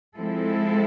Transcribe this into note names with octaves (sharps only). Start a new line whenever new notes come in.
F3 G#3 C4 E4 A4